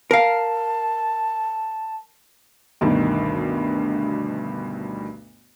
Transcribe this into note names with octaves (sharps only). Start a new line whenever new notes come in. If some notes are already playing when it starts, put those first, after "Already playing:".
A#4 F5 A5
D2 G2 B2 D#3